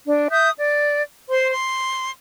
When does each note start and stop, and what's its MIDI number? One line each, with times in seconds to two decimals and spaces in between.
0.07 0.28 62
0.30 0.49 76
0.30 0.49 87
0.30 0.49 91
0.58 1.02 74
1.29 1.51 72
1.29 1.51 84
1.52 2.12 84